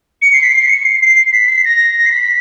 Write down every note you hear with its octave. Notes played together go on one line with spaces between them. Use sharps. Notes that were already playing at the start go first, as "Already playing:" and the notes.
C#7
C7
B6
C7
C#7
C7
C7
B6
C7
A#6
C7
B6